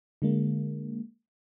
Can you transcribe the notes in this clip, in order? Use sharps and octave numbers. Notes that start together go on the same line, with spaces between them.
D3 G#3 A#3